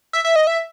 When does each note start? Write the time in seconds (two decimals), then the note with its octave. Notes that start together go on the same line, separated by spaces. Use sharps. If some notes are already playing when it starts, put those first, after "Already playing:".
0.13 E5
0.25 E5
0.36 D#5
0.47 E5